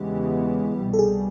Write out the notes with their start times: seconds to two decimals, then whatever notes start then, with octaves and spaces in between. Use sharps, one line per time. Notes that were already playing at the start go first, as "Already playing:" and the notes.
Already playing: E2 C#3 E3 G#3 B3 G4
0.77 C2 B2 G3
0.93 A4
0.99 G#4